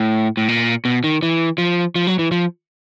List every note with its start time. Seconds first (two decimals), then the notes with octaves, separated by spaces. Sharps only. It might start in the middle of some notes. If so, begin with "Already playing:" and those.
Already playing: A2
0.37 A2
0.48 A#2
0.85 B2
1.04 D#3
1.23 E3
1.58 F3
1.96 F3
2.07 F#3
2.19 E3
2.32 F3